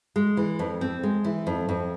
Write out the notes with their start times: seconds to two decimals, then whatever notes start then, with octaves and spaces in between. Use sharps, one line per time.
0.16 G#3
0.37 E3
0.59 F2
0.81 C4
1.03 G#3
1.25 E3
1.47 F2
1.69 F2